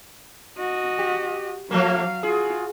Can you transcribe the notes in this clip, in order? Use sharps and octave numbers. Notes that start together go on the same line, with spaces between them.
F#4 D#5
G4
F3 F#3 A3 A#3 F5
F4 F#4 G#4